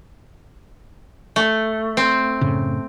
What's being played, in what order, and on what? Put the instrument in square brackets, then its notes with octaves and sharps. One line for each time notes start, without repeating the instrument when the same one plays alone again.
[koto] A3
C4
[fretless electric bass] F#2 A2 C#3